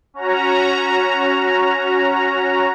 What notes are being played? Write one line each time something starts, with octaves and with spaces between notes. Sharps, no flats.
C#4 F#4 A#5